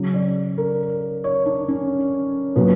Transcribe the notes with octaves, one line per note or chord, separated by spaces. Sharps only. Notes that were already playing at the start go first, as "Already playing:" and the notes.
Already playing: C#3 F#3
D5
A#4
C#5
D4
C#4
A#2 F#3 B3